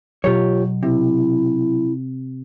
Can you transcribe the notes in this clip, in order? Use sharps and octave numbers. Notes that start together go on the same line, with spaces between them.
B2 F#3 F4 G4 C#5
C3 E4